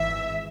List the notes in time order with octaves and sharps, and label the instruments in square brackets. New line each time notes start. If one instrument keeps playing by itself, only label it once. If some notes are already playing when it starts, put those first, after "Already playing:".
Already playing: [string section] G#1 G#2 E3 E5